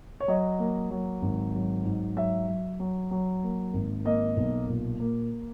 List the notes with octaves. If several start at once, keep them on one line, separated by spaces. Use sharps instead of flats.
C#5
F#3 D#5
A#3
F#3
G#1
F#3
G#2
F#3 E5
F#3
F#3
F#3
A#3
G#1
A#3 D#5
B1
A#2
A#3